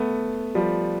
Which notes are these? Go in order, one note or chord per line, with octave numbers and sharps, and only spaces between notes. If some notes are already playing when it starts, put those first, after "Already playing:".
Already playing: A3 B3
F3 G3